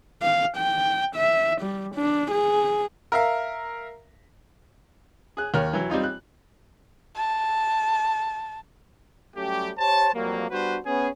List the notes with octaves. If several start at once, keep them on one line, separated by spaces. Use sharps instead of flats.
F5
G5
E5
G3
D4
G#4
A#4 E5 F5
G#4 F#6
D#2 A#4 C#5 F6
E3 F#3
G3 C4 D#4 F4
F#6
A5
F#3 G3 A3 C#4 G4
G4 C5 C#5 A5
F2 F#3 G3 A#3
G3 B3 D4 F#4 B4 C5
B3 C#4 G#4